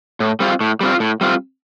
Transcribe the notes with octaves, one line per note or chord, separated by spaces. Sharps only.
A2
G3 C4 F4
A2
G3 C4 F4
A2
G3 C4 F4